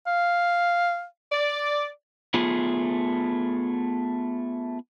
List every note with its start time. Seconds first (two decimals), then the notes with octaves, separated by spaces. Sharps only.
0.07 F5
1.32 D5
2.34 A3 B3 F4 G#4